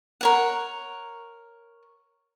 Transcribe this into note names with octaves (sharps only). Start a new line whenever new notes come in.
A#4 C#5 F#5